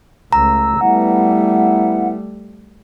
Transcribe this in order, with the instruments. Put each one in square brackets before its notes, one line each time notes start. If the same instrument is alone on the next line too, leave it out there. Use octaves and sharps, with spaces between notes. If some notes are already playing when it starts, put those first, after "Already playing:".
[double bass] C#2 A3 [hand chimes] A#5 [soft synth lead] E6
[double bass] G3 A3 [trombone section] B3 E4 [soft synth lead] F#5